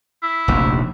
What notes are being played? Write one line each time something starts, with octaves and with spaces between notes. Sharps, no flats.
E4
F1 A#1 D#2